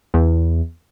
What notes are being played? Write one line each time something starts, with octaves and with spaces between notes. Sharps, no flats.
E2